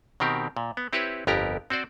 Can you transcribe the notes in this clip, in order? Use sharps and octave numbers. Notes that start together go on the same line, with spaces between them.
B2 D#3 C4 G4 A#4
A#2
B3
C4 E4 G4 B4 C#5
G1 F2 B3 G4 A#4 A#5
C4 F#4 C5 D5